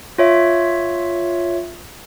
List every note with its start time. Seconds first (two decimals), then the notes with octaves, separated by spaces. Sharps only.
0.18 F4 C#5 E5